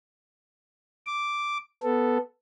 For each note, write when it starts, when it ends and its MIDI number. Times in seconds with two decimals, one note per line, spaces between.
1.07 1.58 86
1.83 2.18 59
1.83 2.18 69